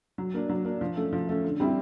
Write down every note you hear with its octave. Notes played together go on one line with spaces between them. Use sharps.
F#3
A#3 D4
F#3
A#3 D4
F3
A3 C#4
F3
A3 C#4
D3
G3 C4 E4